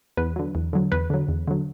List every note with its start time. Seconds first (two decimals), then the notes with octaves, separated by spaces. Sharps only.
0.17 E2 B4
0.36 D3 F#3
0.55 E2
0.73 D3 F#3
0.92 E2 B4
1.10 D3 F#3
1.28 E2
1.48 D3 F#3